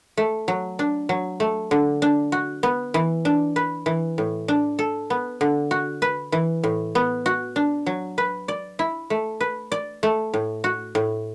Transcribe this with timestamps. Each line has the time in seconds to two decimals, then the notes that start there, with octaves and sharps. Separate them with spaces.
0.17 A3
0.48 F#3
0.79 D4
1.09 F#3
1.40 A3
1.71 D3
2.02 D4
2.32 F#4
2.63 B3
2.94 E3
3.25 D4
3.56 B4
3.86 E3
4.18 A2
4.48 D4
4.79 A4
5.10 B3
5.41 D3
5.71 F#4
6.02 B4
6.32 E3
6.64 A2
6.95 B3
7.26 F#4
7.56 D4
7.86 F#3
8.18 B4
8.48 D5
8.79 E4
9.10 A3
9.41 B4
9.72 D5
10.03 A3
10.34 A2
10.64 F#4
10.95 A2